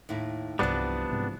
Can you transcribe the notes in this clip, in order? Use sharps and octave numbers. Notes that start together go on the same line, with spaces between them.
D#2 A2 E4
C2 G2 E3 F3 G3 B3 D4
G#2 C3